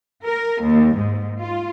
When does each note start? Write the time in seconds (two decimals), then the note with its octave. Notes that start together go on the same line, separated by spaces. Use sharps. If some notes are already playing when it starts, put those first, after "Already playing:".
0.24 A#4
0.62 D#2
0.95 G#2
1.41 F4